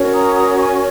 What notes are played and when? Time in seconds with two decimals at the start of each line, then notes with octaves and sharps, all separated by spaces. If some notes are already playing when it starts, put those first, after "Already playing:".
Already playing: C#4 F#4 A#4 C#5
0.14 A#5 D#6
0.35 A#5 D#6
0.57 G#5 C#6